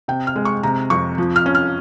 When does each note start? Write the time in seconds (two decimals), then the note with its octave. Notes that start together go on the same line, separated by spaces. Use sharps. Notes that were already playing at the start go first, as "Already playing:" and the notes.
0.08 C3 G5
0.27 F6
0.36 G#3
0.45 C#6
0.63 C3 A#5
0.90 F2 C#6
1.18 F3
1.36 F6
1.46 C#4
1.55 F6